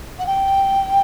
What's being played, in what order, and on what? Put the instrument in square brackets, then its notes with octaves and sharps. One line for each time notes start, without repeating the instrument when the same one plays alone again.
[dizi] F#5
G5